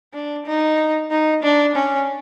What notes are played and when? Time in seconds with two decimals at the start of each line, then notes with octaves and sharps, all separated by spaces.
0.13 D4
0.46 D#4
1.11 D#4
1.43 D4
1.75 C#4